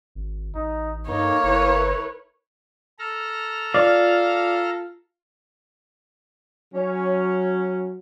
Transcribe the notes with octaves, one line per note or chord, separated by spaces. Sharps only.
G#1
A1 D#4
G2 A#3 D#4 A4 C#5
G1 E4 A#4 B4
A4 A#5 F6
F4 D5 F5
F#3 C#4